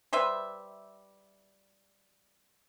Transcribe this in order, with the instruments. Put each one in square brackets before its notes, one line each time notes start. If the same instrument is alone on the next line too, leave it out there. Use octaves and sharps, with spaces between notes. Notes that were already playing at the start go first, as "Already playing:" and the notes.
[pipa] G3 B4 C5 E5